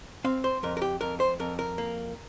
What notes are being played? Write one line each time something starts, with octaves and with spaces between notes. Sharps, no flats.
C4 F5
C5
F2 A#4
A#4
G4
F2 A#4
C5
F2 A#4
A#4
A#3